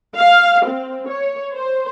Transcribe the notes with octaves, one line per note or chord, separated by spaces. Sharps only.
F5
C4
C#5
C5